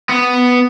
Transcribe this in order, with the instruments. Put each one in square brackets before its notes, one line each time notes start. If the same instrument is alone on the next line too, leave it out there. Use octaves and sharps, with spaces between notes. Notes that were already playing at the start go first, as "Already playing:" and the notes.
[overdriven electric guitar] B3